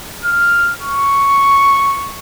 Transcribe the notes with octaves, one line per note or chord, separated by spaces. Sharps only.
F6
C#6